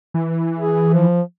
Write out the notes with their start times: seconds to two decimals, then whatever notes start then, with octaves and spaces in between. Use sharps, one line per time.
0.14 E3
0.59 G#4
0.93 F3